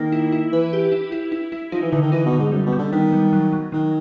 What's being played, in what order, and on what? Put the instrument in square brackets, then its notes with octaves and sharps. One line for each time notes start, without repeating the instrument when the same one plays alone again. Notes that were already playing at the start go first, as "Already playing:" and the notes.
Already playing: [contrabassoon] D#3 [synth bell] A#3
[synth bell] E4
E4
[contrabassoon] E3 [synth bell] B4
[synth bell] G4
E4
E4
E4
E4
[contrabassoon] F3 [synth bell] D#4
[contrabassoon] E3
[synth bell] D3 [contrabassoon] E3
[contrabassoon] D#3
[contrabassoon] E3 [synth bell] D#4
[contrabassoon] B2
[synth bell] D3
[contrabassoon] G#2
[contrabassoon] F#2 [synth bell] G3
[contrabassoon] B2
[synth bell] G3
[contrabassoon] D3
[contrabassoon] D#3 [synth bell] B3
[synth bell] G3
F#3
F#3
[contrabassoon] D#3 [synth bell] F#3